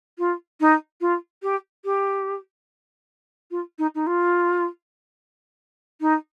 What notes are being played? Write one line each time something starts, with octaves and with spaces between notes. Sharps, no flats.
F4
D#4
F4
G4
G4
F4
D#4
D#4
F4
D#4